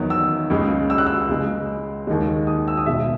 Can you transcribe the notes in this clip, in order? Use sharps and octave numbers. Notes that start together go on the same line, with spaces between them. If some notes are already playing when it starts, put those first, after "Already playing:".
Already playing: E2 D#3 F#3
E6
C#2 C#3 G#3
E6
F#6
E6
C#2 C#3 G#3
D#2 D#3 G#3
D#6
E6
D#6
B1 B2 G#3 E5